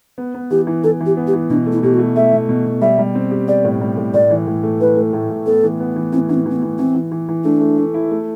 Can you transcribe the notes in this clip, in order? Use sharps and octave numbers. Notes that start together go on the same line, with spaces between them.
B3
B3
E3 G4
E3
E3 A4
E3
G4
B3
G4
E3
B2 D4
A3
E4
B2 G4
F#4
A3
A3 E5
B2
B2
B2
G3 E5
G3
C4
G4
G4 D5
A2
G3
A2
A2 D5
E3
A2
A3
E3 B4
A3
A2
A2
B3 A4
E3
B3
E3
E3 C4
E3 D4
C4
E3 C4
B3
E3
E3 C4
E3
E3
E3
A3 D4
A3
A3
E4
A3